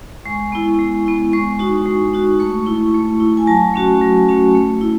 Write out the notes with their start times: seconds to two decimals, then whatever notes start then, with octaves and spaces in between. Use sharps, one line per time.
0.25 G#3 C#6
0.52 B3 E4
0.79 G#3
1.06 B3 E4
1.33 G#3 C#6
1.59 D#4 F#4
1.86 G#3
2.14 D#4 F#4
2.40 A3 C#6
2.66 E4
2.94 A3
3.20 E4
3.37 G#5
3.47 F#3 A5
3.74 A3 C#4 F#4
4.01 F#3
4.28 A3 C#4 F#4
4.55 A3
4.81 E4